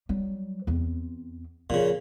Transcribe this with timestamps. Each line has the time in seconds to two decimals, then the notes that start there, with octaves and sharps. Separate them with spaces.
0.09 F#3 G3
0.67 E2 C4
1.70 A#2 C#3 F3